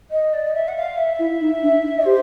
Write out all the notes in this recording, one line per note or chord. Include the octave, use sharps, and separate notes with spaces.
D#5
D5
D#5
E5
F#5
F5
E5
E4
D#4
D4
G4 C5